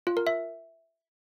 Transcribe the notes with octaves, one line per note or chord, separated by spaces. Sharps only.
F4
A#4
E5